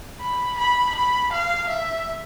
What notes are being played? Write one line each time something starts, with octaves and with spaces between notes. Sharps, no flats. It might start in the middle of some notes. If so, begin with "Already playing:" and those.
B5
B5
B5
F5
E5